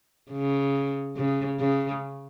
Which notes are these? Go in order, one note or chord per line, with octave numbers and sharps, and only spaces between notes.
C#3
C#3
C#3